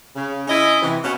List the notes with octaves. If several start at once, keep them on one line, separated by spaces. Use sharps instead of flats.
C#3
C#4 E4 D#5
C3 E3
B2 C#4